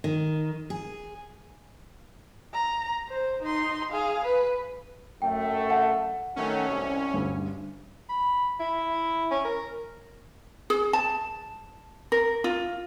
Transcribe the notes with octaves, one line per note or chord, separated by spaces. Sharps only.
D#3
G#4
A#5
C5
D#4 C6
G#4 F5
B4
F#2 A3 G5
F#5 A5
D#3 F#3 A3 C#4
C2
D2 G2
B5
E4
C#4
A#4
G#4
A5
A#4
F4